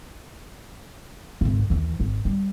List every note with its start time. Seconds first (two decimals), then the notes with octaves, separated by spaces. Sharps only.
1.41 G#1 C#2
1.70 D#2 E3
2.00 G#1
2.25 G3